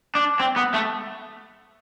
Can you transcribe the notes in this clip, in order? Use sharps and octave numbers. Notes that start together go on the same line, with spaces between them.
D4
C4
B3
A3